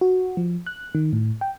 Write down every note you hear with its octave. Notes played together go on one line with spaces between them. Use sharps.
F#4
F3
F#6
D#3
A2
G5